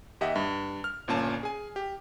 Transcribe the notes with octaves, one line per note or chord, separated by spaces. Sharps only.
D#2 G4 D#5 E5 F#5
G2
F6
G1 A#2 C#4 A5
G#4 G#5
G4